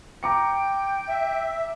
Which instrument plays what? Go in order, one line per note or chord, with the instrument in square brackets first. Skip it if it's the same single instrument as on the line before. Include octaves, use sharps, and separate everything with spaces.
[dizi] G5 [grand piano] A#5 D6 C#7
[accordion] E5